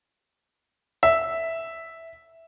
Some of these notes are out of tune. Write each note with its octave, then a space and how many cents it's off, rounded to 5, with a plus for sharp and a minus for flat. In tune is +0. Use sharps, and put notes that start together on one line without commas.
E5 -5